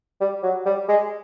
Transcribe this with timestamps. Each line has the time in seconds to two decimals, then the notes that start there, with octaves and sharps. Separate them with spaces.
0.21 G3
0.43 F#3
0.66 G3
0.89 G#3